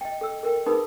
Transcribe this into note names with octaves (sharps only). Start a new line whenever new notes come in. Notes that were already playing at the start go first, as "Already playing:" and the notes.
D#5 G5
A4 G5 E6
A4 A#4 G5
D#4 G#4 A#4 B4 B5 D#6